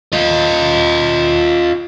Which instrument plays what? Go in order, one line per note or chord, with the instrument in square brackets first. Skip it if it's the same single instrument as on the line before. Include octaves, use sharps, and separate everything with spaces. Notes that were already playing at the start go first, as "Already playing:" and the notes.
[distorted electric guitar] F4 D#5